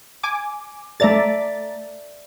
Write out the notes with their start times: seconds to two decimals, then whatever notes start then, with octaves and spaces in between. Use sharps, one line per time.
0.23 G#5 D6
1.00 A3 A4 D5 E5 A#5 A6